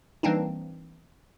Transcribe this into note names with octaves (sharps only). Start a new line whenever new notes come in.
E3 G3 A#3 C4 D4 D#4